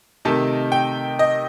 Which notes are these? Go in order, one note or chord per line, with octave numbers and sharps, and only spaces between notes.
C3 D#3 A3 D#4 A5
G5
D#5